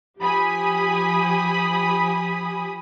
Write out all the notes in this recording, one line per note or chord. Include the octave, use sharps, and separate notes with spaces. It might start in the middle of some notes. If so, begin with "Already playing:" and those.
F3 G4 G#5 B5 D#6